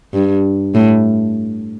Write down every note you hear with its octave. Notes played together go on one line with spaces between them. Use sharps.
G2
A2